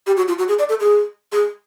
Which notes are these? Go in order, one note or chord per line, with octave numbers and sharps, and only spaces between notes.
G4
F#4
F4
F#4
G#4
D5
A4
G#4
G#4